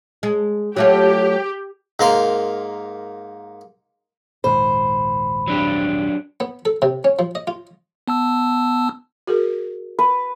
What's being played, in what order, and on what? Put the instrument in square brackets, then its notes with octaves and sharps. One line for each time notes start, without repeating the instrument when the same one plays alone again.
[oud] G#3
[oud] F#3 A3 F4 [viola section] G4
[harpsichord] G#2 A#3 A#4 C6
[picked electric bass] A#1 D#2 G#2 [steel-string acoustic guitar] C5 [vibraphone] B5
[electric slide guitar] F#3 D4 G4
[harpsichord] B3
A4
C3
C#4
F3
D#5
F4
[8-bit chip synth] B3 A5 E6
[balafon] F#4 G#4 A#4
[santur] B4